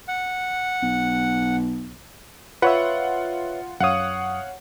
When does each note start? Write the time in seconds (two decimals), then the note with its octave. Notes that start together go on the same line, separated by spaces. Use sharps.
0.08 F#5
0.82 B1
2.62 F4 B4 C#5 E5 F#5
3.80 F#2 C#5 F5 F#5 D#6